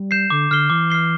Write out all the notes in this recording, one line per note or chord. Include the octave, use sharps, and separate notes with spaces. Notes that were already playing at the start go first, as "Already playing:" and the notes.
Already playing: G3
G6 C7 E7
D3 D6
D3 F6 C7 G7
E3 D6
F6 C7 G7